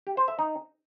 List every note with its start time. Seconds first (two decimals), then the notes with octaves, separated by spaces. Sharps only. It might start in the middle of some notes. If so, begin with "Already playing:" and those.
0.07 G4
0.17 C5
0.28 E5
0.39 D#4